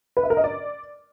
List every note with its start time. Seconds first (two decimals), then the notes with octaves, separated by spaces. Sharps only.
0.17 B4
0.23 E5
0.30 A#4
0.37 D#5
0.44 D5